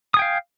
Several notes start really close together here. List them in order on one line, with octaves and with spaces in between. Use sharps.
D#6 G#5 G5 F5